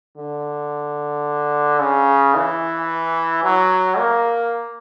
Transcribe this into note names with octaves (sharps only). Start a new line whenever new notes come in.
D3
C#3
E3
F#3
A#3